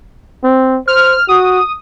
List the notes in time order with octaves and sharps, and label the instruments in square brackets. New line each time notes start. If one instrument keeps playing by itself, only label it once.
[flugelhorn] C4
[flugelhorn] C5 [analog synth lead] F6
[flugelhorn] F#4 [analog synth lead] D#6